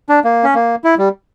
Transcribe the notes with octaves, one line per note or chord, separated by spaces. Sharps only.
D4
A#3
C#4
A#3
E4
G3